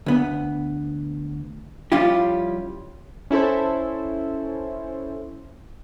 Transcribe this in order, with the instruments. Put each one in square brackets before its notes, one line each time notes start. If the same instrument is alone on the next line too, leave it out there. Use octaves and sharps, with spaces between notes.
[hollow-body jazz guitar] D2 B3
F3 G3 C#4 E4 F4 G4
[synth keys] C#4 E4 A4 C5